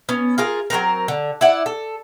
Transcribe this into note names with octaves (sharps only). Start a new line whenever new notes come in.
B3 C#4
F4 G#4 A#4
F#3 G3 C4 A#4
D3
E4 D5 F#5
A4